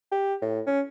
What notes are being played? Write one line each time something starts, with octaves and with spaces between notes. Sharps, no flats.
G4
A2
C#4